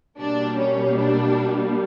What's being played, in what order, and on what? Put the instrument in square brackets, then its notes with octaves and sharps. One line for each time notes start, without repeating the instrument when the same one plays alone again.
[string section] B2 G3 A#3 D4
C#4
D4